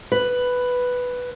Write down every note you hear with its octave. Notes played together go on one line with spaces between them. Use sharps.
B4